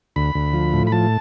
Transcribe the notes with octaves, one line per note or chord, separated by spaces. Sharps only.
D2 B5
D2
F3
A2
B5
F3 A5